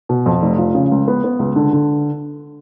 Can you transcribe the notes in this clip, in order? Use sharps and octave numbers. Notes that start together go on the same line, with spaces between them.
B2
F2
F1
F3
C#3
C#2
B3
B3
C#2
D3
D3